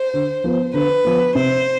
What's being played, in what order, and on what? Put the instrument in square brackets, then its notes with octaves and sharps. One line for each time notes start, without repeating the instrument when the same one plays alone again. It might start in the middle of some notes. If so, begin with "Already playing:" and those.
Already playing: [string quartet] C5
[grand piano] D3
F3 B3
[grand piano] D3 [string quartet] B4
[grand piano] F3 B3
[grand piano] C3 [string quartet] C5